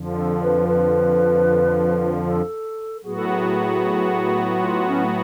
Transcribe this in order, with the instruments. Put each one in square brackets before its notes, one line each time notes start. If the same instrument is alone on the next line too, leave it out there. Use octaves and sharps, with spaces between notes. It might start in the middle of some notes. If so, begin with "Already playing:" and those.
Already playing: [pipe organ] F2 D3 F3
[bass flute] A4
B4
B4
A4
[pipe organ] A2 F#3 B3 F#4 [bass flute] G#4
[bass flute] A4
G#4
F4
C#4
A3